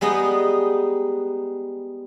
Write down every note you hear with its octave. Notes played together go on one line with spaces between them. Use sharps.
G3 G#3 B3 D#4 D#5